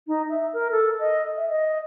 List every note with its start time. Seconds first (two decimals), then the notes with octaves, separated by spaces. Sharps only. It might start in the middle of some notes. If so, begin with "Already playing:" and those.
0.07 D#4
0.29 E5
0.53 A#4
0.71 A4
0.99 D#5
1.37 E5
1.49 D#5